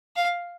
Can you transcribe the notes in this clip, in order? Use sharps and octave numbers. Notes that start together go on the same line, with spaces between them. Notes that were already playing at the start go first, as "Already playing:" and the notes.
F5